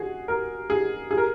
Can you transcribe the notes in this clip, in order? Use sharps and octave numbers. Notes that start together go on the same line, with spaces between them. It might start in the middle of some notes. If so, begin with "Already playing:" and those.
Already playing: F#4 G#4
A#4
G#4
G#4
A#4